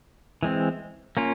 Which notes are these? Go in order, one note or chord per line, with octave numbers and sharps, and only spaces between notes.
E3 G#3 C4
A#3 C#4 F4